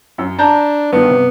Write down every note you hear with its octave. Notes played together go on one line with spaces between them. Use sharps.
F#2
D4 A5 A#5 G6
G2 D#3 B3
C3